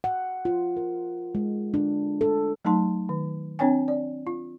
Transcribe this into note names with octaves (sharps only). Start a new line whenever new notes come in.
F#5
F4
A#4
G#3
D4
A4
F#3 A3 D#4 A5 C6
D#3
C4 D4 C#5 G5 G#5
D5
F4